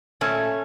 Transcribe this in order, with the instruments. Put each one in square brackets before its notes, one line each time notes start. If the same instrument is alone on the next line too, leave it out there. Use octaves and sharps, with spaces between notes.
[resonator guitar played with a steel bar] A#2 A3 C#4